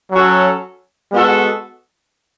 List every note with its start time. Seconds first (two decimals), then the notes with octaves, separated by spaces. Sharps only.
0.12 F#3 C#4 F#4 A4
1.12 G#3 B3 F#4 A4